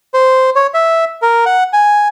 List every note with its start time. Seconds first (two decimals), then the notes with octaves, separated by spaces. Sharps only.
0.14 C5
0.56 C#5
0.74 E5
1.22 A#4
1.46 F#5
1.73 G#5